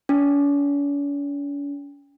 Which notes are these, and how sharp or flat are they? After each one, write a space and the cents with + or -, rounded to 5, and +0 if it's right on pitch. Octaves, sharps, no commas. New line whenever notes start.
C#4 +45